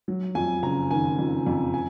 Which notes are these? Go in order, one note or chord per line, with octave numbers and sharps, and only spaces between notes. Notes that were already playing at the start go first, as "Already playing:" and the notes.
F#3
F2 G#5
F#1 A#5
D#3 G#5
F2
F2
G#5